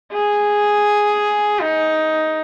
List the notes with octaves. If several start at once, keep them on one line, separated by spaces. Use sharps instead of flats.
G#4
D#4